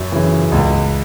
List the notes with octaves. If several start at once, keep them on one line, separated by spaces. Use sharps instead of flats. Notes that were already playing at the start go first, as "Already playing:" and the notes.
Already playing: F#2
C#3 E3
C#2